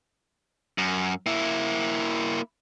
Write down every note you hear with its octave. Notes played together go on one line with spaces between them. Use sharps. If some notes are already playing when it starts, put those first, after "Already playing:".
F#2
A#3 E4